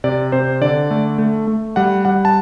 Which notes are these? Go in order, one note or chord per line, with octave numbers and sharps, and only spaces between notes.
C3 D5
C3 C5
D3 D5
A3
A3
A3
G3 F#5
G3 F#5
A5